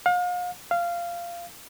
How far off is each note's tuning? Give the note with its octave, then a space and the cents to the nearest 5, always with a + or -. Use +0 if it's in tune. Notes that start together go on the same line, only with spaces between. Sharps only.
F5 +40
F5 -15